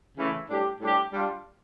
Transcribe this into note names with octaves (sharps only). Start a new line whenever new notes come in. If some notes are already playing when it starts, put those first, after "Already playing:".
C#3 E3 A3 E4
A2 G3 D4 G4
A2 G3 D4 G4
G3 D4 F4